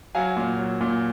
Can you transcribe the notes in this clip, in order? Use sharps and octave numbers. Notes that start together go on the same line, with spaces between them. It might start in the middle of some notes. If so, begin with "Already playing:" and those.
F#3 F5 G#5
A#2
F#3
A#2